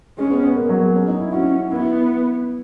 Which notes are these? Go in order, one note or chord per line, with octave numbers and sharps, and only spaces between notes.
G#3 C#4
B3
B3
A#3
F#3
G#3
C#4
D#4
E4
C#4 F#4
B3 E4